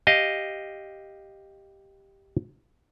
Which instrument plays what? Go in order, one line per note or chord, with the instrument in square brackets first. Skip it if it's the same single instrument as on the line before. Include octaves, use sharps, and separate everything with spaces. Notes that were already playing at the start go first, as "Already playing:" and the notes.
[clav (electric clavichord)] G4 D#5 F5